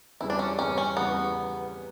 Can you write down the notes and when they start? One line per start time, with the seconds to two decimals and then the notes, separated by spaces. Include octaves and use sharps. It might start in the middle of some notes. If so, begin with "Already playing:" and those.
0.21 E2 C#3 G3 E4
0.30 D4
0.39 C#4
0.59 E2 C#3 G3 C#4
0.78 C#4
0.97 E2 C#3 G3 B3